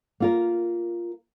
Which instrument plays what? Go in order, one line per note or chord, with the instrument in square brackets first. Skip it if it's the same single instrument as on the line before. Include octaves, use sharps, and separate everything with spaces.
[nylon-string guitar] A#3 F4 A#4